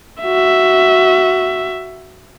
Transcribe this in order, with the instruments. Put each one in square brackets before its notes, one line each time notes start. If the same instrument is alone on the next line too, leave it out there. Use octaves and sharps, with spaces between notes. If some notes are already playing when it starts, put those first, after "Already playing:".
[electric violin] F#4 E5